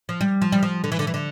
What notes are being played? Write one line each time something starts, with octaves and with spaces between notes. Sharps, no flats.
F3
G3
F3
G3
F3
D3
E3
D3
E3
D3